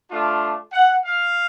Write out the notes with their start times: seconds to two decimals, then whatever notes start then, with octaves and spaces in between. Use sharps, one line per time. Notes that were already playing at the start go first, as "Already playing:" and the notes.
0.10 A3 D4 F4
0.73 F#5
1.04 F5